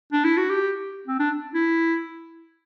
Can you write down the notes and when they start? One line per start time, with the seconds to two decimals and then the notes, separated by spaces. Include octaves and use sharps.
0.12 D4
0.24 E4
0.37 F#4
0.50 G4
1.07 C4
1.20 D4
1.54 E4